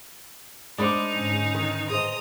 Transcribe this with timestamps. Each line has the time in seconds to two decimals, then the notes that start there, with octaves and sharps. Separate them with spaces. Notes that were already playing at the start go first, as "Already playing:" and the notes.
0.78 G#3 D4 D#4 C5 D5 B5 D6
1.11 G#2 D3 C#4
1.55 D#3 B4
1.90 A2 G#4 C5 D#5 A#5 D#6